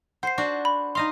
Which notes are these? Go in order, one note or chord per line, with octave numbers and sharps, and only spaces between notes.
C5 F#5 C7
D4 F#4
B5
D#4 D#5 F5 C6